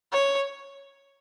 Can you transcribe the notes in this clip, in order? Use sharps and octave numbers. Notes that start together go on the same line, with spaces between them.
C#5